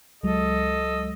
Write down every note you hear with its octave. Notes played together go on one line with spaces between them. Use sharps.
C#2 F#3 G#3 A4 D#5